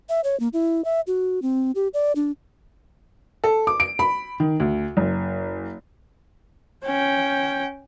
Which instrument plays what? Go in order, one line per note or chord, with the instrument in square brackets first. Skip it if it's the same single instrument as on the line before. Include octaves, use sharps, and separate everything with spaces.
[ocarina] E5
C#5
A#3
E4
E5
F#4
C4
G4
D5
D4
[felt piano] A4
D6
D7
B5
D#3
D2
F#1
[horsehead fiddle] C#4 G5